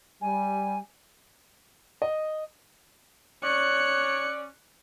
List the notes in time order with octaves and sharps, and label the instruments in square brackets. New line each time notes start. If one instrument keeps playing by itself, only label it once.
[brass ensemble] G3 [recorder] G#5
[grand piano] D#5
[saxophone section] C#4 D5 [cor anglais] C#5 [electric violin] F#6 C#7